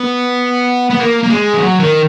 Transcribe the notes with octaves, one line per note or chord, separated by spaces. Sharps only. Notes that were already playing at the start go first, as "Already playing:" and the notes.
Already playing: B3
B3
A#3
A#3
G#3
E3
F#3
D#3